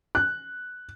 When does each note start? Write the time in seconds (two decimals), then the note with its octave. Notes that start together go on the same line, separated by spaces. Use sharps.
0.15 F#6